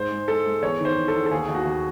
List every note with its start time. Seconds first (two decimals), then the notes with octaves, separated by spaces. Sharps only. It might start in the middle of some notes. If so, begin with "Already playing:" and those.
Already playing: G#2 C5
0.11 G#3
0.28 G#3 A4
0.45 G#3
0.62 E2 C#5
0.80 D#3
0.85 C5
0.97 E2
1.08 A4
1.13 E2
1.26 A4
1.31 D#2 G#4
1.49 D#2
1.54 F#4
1.65 D#2